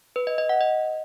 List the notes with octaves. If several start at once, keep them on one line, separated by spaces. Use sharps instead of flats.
B4
D#5
D#5
F#5
D#5